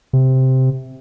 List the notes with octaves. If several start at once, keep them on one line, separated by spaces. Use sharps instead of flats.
C3